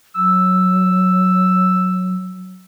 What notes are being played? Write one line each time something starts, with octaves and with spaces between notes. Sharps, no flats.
F#3 E6